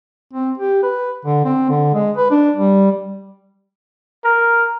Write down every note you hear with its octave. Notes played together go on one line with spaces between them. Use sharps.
C4
G4
B4
D3
C4
D3
G#3
B4
D4
G3
A#4